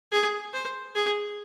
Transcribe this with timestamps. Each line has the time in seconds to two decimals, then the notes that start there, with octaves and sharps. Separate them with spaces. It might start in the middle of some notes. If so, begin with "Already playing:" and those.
0.12 G#4
0.53 C5
0.95 G#4